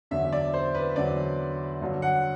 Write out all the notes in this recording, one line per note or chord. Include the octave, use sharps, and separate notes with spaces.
E2 D3 F#3 E5
D5
C5
B4
E2 D3 F#3 D5
G2 D3 F#3
F#5